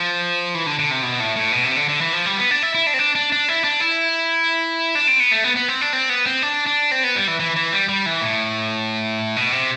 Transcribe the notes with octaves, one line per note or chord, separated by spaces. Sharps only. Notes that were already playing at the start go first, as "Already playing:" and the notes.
Already playing: F3
E3
D3
D3
C3
B2
A2
A2
B2
C3
D3
D3
E3
F3
G3
B3
D4
E4
E4
D4
C4
D4
D4
D4
E4
D4
E4
D4
C4
B3
A3
B3
B3
C4
D4
C4
B3
C4
D4
D4
C4
B3
G3
E3
E3
E3
G3
G3
E3
A2
B2
C3